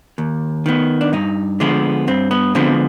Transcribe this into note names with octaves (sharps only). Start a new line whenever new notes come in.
D#2
D#3 B3
D4
G2 D#4
D3 F3 G#3 B3
G2 C4
B3
D3 F3 G#3 B3 C4